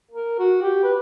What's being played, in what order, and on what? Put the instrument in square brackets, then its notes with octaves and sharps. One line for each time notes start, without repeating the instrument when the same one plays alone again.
[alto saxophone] A#4
F#4
G4
B4